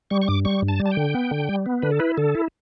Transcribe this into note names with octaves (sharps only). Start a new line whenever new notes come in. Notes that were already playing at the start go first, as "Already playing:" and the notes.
G3 C#6
C#6
G2 D6
G3 C#6
G2
A5
G3
A5
G5
D3
B3
D3
G3
B3
D3 B4
A4
E4 B4
D3 A4
E4